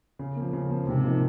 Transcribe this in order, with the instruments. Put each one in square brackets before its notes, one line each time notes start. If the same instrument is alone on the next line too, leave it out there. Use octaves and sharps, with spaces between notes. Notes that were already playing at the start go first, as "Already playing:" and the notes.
[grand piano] C#3
F3 A#3
C#3
F3 A#3
[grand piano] G#2 [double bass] C3
[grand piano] F3 A#3 D#4 A#4